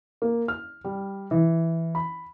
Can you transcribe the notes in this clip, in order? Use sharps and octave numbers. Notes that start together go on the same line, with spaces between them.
A#3
F6
G3
E3
B5